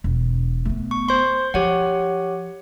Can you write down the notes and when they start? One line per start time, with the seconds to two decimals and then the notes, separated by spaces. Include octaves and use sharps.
0.04 E1
0.65 A3 B3
0.91 C#6
1.08 C5 C6
1.54 F3 G4 C#5 F#5